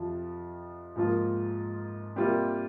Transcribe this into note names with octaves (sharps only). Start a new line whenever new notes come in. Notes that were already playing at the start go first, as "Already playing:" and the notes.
Already playing: F2 C3 F3
G#2 F3 A#3 F4
C3 G3 A#3 F4